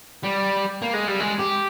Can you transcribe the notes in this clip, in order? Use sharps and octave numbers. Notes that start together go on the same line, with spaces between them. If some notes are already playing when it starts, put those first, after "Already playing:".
G3
A#3
G#3
G3
G#3
G4